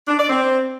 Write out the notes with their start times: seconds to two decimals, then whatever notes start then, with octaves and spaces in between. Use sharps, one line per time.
0.08 D4
0.19 D5
0.29 C4